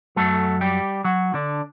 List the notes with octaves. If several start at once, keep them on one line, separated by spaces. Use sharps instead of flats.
F#2 F#3 A3 A4
G3 G4
F#3 F#4
D3 D4